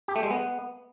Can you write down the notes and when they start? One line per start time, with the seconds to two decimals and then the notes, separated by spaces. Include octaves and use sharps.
0.08 G4
0.16 A3
0.23 G#3
0.31 B3